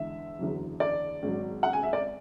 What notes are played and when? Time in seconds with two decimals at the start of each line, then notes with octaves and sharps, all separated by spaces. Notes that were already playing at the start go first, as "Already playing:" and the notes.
Already playing: E2 D3 G#3 E5
0.39 F#1 E2 D3 F#3
0.80 D5
1.22 G#1 G#2 F#3
1.63 F#5
1.73 G#5
1.83 E5
1.93 D5